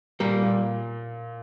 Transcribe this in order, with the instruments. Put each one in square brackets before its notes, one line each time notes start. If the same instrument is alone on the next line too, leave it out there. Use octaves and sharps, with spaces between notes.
[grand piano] A#2 [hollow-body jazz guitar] G3 A#3
[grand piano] A#2